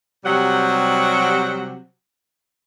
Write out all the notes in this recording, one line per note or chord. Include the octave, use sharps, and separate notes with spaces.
C3 F#3 G3 F#5